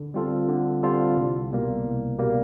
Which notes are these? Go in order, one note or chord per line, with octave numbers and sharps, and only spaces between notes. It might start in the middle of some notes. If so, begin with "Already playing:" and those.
Already playing: D3
G3 C4 F4 A4
D3
G3 C4 F4 A4
C2
B2 G3 A#3
C2
B2 G3 A#3